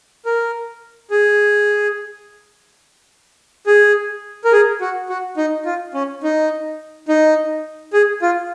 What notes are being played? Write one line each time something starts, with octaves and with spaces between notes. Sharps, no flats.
A#4
G#4
G#4
A#4
G#4
F#4
F#4
D#4
F4
C#4
D#4
D#4
G#4
F4